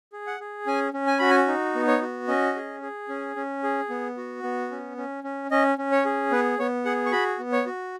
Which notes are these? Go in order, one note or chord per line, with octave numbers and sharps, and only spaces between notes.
G#4
F#5
G#4
C#4 G#5
C#4
G#5
F#4 B5
G#5
D#4
B3
C#5
F#4
C#4 D#5
G#4
G#4
C#4
C#4
G#4
B3
F#4
B3
C#4
C#4
C#4
C#4 D#5
C#4
C#5
G#4
B3 B4
B3 C#5
G#4 F#5
C#6
F#4 B5
B3
C#5
F#4